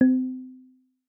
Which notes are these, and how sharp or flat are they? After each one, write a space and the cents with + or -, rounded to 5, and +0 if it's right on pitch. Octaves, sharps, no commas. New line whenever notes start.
C4 -30